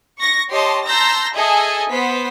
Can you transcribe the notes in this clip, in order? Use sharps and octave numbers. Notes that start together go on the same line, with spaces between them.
C#6 A#6
G4 C#5 D#5 A5 C6
A5 A#5 C6 E6 G6 A#6
G#4 A4 D#5 E5 G#5
B3 C5 B6